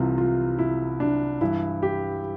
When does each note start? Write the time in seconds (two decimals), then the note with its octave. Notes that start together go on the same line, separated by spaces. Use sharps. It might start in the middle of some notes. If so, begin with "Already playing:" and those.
Already playing: C2 C3 E3 F4
0.18 F4
0.59 E4
1.00 D4
1.41 G2 E3 E4
1.83 G4